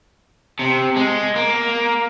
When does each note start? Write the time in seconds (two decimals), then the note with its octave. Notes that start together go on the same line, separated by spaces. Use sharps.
0.59 C3
0.96 G#3
1.36 A#3